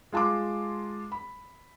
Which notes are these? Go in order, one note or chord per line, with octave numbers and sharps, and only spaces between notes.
G#3 F4 A5 C6 D6
B5